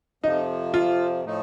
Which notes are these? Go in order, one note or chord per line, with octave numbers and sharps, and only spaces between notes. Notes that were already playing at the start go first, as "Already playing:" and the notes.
F2 C3 F3 D#4
F4
A2 F3 A3 D#4